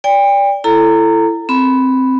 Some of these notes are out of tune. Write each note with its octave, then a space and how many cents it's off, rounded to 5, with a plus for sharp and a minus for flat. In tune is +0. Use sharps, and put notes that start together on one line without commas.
D5 -25 G5 +35
E4 +25 A4 +0 A#5 -20
C4 +0 B5 +0